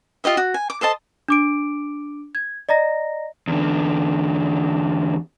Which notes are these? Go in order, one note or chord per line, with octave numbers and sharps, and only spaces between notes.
F4 G4 D#5 E5
F#4
G#5
D6
A4 C5 D#5 A5
D4 D6 D7
G#6
D5 D#5 A#5 A#6
E2 D3